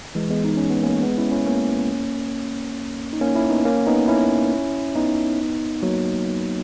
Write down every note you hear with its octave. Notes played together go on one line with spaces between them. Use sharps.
E3 G#3
G#3 B3
D#4
C#4
B3
A#3 C#4
G#3 B3
C#4 E4
C#4 E4
A#3 C#4
D#4
A#3 C#4
C#4 E4
B3 D#4
A#3 C#4
B3 D#4
C#4 E4
B3 D#4
F#3 A#3